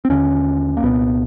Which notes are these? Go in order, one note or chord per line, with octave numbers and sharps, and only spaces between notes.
C4
D#2 D3 C#4
A#3
C2 A#2 B3